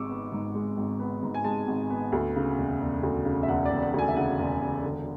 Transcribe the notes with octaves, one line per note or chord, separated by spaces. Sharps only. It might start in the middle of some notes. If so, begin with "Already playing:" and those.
Already playing: G#1 G#2 G#3 C#6 D6 E6
B3
G#2
G#3
G#1
B3
G#2
G#5
G#3 A5
G#1
B3
D2
C#3
E1
E1
D2
C#3
E5
E1 F#5
D5
E1
F#5
D2 G#5
E5
C#3 F#5
E1
E1
D3